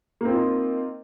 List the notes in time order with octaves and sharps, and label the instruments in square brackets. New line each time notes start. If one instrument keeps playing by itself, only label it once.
[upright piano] A#3
C4
F4
D#4